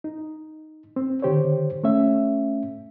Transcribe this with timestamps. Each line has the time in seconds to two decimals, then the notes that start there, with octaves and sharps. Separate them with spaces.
0.04 D#4
0.96 C4
1.22 D3 D#3 G4 C5 C#5
1.84 A3 C#4 E5